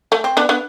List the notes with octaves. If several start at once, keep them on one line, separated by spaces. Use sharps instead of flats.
A3
C4
B3 D4
B3 D4